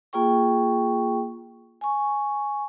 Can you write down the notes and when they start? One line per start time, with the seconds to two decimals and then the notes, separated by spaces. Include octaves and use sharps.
0.13 A#3 F4 G#4 G5 C#6
1.81 G#5 C#6